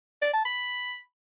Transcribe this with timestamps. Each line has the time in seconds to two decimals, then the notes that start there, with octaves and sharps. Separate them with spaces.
0.22 D5
0.33 A5
0.45 B5